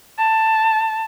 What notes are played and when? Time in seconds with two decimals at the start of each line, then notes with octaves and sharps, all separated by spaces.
0.19 A5